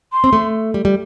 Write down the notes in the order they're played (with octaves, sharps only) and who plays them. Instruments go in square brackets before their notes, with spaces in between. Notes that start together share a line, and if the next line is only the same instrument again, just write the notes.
[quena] C6
[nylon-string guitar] C4
A3
G3
G3